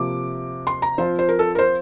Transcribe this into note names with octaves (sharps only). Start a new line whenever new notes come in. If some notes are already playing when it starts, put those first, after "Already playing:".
Already playing: C3 F3 A#3 D6
C6
A#5
F3 C4 F4 C5
C5
A#4
A4
A#4
C5